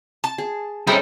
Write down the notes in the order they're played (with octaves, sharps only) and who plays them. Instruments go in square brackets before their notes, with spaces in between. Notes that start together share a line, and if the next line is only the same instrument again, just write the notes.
[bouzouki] A5
[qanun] G#4
[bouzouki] G3 G#3 G#4 [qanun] C#4 A4 C5 [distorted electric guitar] D#4 E4